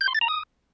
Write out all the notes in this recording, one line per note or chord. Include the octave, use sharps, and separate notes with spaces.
G6
C6
A6
A#5
D#6